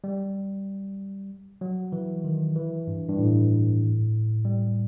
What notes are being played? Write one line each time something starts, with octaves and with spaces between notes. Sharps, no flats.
G3
F#3
E3
D#3
E3
G2
G2
A2
G3